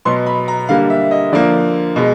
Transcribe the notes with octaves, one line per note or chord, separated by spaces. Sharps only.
B2 F#3 B3 C6
B5
A#5
D3 G3 A#3 F5
E5
D#5
D3 F3 A#3 D5
B2 G#3